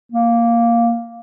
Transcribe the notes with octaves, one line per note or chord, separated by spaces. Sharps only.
A#3